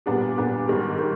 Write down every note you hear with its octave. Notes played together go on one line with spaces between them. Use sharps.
A#2 G3 B3 D4 G4
A#2 G3 B3 D4 G4
G#2 D#3 G3
D#3 G3